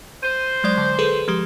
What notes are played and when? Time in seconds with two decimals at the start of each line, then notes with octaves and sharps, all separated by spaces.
0.23 C5 D#7
0.64 F#3 G#3 D5
0.77 D3
0.99 G#4 A4 B4
1.28 F3 G#3 G4